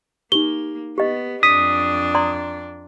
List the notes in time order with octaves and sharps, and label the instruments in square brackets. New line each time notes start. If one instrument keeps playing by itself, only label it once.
[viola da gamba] A#3 [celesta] D#4 G7 [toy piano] G4
[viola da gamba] B3 [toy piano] G4 D#5
[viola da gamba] F2 D4 [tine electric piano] D#6 [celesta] B6
[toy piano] D5 A#5 C6